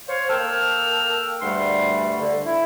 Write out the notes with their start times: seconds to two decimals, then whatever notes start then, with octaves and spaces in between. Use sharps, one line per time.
0.08 C5 C#5 F5
0.30 A#3 A4 G5 E6 F6
1.41 D2 G2 G3 A3 F#5 C6
2.19 D3
2.46 E4